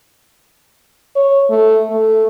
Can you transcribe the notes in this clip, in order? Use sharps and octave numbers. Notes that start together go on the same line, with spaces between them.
C#5
A3
A3